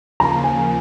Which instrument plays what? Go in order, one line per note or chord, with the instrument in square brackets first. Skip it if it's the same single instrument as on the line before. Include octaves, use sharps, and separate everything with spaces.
[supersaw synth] D#2 C#3 F3 A#3 [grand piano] A#5
[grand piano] G#5